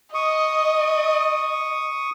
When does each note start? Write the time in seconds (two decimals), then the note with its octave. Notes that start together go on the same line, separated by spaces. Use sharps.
0.14 D#5 C#6 D#6